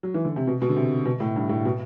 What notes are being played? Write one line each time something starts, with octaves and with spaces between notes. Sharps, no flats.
F#3
E3
D3
C3
B2
B2
D3
C3
B2
A2
G2
A2
B2